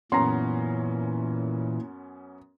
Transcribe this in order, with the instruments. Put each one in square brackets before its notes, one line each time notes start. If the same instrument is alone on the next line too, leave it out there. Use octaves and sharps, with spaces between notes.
[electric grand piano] F#2 B3 C#4 [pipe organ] A#2 E3 [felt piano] A#5 C6